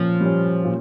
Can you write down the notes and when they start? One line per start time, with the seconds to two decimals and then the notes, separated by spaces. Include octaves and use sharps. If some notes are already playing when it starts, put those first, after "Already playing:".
Already playing: A#2 F3 C#4
0.21 G3 C#4
0.65 A#2